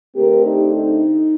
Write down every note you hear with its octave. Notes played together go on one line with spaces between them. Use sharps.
D3 A3 C4 G4 A#4
D#4 G4
D#4